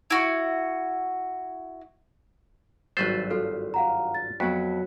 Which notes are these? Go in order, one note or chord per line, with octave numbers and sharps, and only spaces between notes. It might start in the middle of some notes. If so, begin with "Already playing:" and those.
E4 F#4
G#1 G2 F#3 B4 C5 E6 A6
F4 A4
F5 F#5 A#5
A6
F2 F#3 B3 F#4 B6